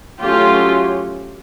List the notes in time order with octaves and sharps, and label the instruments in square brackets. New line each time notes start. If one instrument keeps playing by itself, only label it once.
[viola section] F#3 A3 C#4 F4 G4